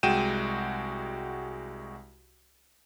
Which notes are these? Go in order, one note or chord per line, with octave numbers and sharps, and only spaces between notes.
C2 G#3 F#4 G5 D#7 E7